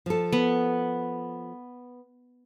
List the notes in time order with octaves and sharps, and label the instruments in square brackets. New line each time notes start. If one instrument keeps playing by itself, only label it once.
[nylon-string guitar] F3 A4
[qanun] B3